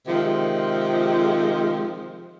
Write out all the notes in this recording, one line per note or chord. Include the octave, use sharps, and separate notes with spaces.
C3 D#3 F3 G#3